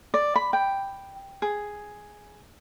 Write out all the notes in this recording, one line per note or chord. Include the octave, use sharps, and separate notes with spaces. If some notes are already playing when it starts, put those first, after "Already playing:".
D5
B5
G5
G#4